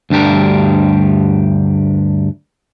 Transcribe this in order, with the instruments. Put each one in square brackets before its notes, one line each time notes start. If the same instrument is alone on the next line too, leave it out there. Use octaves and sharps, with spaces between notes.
[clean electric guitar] D2 G2 D4 G4 A#4